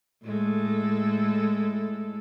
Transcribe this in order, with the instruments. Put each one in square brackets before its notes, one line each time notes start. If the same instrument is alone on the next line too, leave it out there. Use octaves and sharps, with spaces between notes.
[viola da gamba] A2 G#3 A4